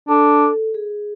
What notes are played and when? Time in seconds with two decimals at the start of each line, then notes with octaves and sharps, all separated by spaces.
0.08 D4 A4
0.74 G#4